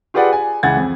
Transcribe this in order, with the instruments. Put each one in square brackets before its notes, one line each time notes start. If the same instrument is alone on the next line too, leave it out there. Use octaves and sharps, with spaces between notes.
[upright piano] F4 G4 G#4 B4 D5 F#5
G#5
C#2 E3 F#5 G#6 A6
F2